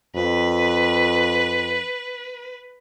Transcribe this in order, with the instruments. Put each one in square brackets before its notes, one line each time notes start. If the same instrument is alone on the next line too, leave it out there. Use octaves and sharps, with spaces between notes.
[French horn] F2 [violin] B4